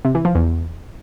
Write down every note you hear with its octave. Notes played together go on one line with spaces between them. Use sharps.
C3
E3
F3
E2